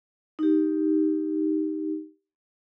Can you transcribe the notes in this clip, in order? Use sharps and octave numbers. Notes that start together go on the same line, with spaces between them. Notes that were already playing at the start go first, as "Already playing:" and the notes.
D#4 G4